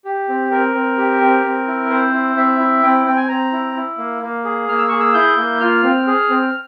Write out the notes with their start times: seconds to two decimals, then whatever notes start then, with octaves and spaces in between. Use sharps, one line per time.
0.05 G4
0.29 C4
0.51 C4 A#4
0.74 C4
0.98 G4
1.21 C4
1.44 C4
1.68 E4
1.90 C4 C5
2.13 E4
2.36 C4 E5
2.60 E4
2.83 C4 G5
3.05 C4 G5
3.16 G#5
3.29 C4 A#5
3.53 E4
3.76 E4
3.98 A#3
4.22 A#3
4.45 G#4
4.68 A#3 F6
4.78 E6
4.89 G#4 C#6
5.00 E6
5.14 E4 G6
5.38 A#3
5.60 F4 F6
5.83 C4
6.07 G#4 F6
6.30 C4